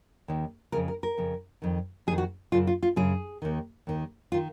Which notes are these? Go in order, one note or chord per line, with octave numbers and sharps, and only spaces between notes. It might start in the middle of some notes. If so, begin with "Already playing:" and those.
D#2 D#3
F2 C#3 A#4
A#4
A#4
F2 C#3
F2 D#3
F2 D#3 G#4
F#4
F#2 C#3 F4
F4
F4
F#2 C#3 G#4
D#2 D#3
D#2 D#3
D#3 F4